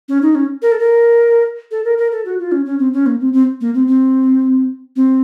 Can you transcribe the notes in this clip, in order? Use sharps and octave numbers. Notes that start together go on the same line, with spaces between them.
C#4
D#4
C#4
A#4
A4
A#4
A4
A#4
A#4
A4
F#4
F4
C#4
C#4
C4
C#4
A#3
C4
C4
A#3
C4
C4
C4